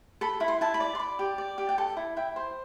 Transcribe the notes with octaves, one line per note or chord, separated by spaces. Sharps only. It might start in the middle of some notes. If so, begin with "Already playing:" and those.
A4 B5
E4 B5
C6
E4 A5
B5
D5
C6
D5 B5
G4
D5
G4
G5
A4 A5
E4
E4 G5
C5